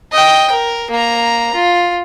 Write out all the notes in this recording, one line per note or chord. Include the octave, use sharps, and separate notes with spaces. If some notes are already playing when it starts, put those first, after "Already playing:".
D#5 G5
A#4
A#3 A#5
F4